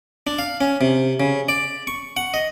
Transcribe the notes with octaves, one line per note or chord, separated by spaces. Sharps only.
D4
F5
C#4
C3
C#3
D5
C#6
F#5
D#5